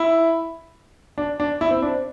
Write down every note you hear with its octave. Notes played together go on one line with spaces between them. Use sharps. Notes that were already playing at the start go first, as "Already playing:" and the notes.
Already playing: E4
D4
D4
E4
C4
D4